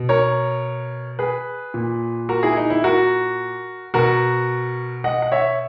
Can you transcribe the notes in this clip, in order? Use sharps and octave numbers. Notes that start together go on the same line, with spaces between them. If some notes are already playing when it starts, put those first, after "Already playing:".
Already playing: B2
A#4 C#5
G#4 B4
A#2
F#4 A#4
E4 G#4
D#4
E4
F#4 A#4
B2 F#4 A#4
D#5 F#5
F#5
C#5 E5